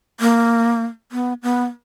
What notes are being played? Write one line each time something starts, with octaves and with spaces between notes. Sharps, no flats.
A#3
B3
B3